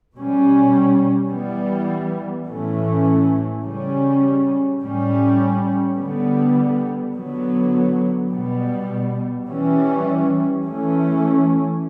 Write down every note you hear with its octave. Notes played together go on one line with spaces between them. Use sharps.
B2 G3 C#4
E3 G3 B3
A2 E3 A3 C#4
C#3 G3 C#4
A2 G3 C#4
D3 G3 B3
D3 F#3 B3
B2 G3 B3
E3 G3 C#4
E3 A3 C#4